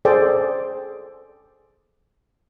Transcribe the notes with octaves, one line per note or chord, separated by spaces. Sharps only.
G#4 A4 C5 D5 G5